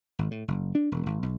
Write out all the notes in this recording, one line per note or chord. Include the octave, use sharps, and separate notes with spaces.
G#1
A2
F#1
D4
E1
G#1
B1